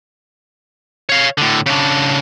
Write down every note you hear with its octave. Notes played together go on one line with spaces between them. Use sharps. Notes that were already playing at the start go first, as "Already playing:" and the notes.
C#5 F5
A2 D3
C#3 D4